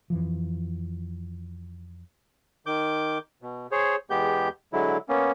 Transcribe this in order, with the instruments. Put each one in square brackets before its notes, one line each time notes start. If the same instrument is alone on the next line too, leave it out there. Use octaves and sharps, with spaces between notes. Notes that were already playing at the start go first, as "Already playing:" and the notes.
[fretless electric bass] F2 E3 F3
[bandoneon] D#3 D6 G6
B2
G#4 C5 C#5
E2 G#3 B3 G4 G6
D3 F#3 G#3 E4
A#3 B3 C#4